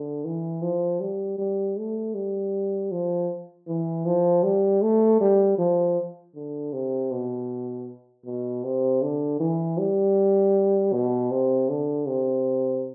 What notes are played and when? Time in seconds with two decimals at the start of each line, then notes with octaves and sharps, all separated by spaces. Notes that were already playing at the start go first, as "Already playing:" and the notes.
Already playing: D3
0.24 E3
0.62 F3
1.00 G3
1.38 G3
1.77 A3
2.14 G3
2.91 F3
3.68 E3
4.05 F3
4.43 G3
4.82 A3
5.20 G3
5.58 F3
6.35 D3
6.73 C3
7.11 B2
8.25 B2
8.63 C3
9.02 D3
9.40 E3
9.78 G3
10.93 B2
11.31 C3
11.69 D3
12.07 C3